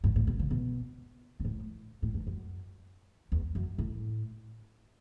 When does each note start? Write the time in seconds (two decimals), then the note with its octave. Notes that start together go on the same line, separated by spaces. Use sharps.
0.04 G2
0.16 A2
0.27 B2
0.39 C#3
0.51 B2
1.40 B2
1.45 A2
2.02 A2
2.14 G2
2.27 F#2
3.32 E2
3.55 F#2
3.78 A2